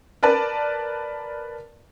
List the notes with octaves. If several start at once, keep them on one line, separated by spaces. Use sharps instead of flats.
A#4 B4 D5 A5